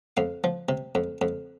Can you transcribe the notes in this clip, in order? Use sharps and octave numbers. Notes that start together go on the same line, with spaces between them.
F2 F5
F3
C3
F2
F2